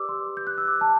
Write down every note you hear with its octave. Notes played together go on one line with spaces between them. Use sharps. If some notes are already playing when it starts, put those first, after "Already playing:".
Already playing: G4 B4 D5 D6 E6
C6
G6
F#6
E6
D6
A5